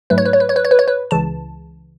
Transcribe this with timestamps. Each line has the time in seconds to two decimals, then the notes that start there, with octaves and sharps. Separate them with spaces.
0.10 G#2 F#3 A3 B4
0.18 C#5
0.25 B4
0.33 C#5
0.40 B4
0.49 C#5
0.56 B4
0.65 C#5
0.71 B4
0.79 C#5
0.88 B4
1.11 C#2 C#3 E3 A5